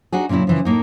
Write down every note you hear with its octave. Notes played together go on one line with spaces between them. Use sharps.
D4 D#4 F#4 G#4
A#2 C#3 F#3 C#4 E4
C#3 E3 F3
A2 A#3 D#4